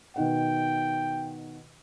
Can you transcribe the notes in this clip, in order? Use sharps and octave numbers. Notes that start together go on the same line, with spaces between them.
B2 D#3 F#5 G5